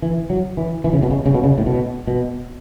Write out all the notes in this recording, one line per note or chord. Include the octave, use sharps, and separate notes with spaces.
E3
F#3
E3
E3
C#3
B2
C#3
C#3
B2
C#3
A2
B2
B2